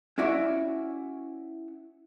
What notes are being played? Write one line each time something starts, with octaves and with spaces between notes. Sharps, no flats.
C#4 E4 F#4 D5 E5 F#5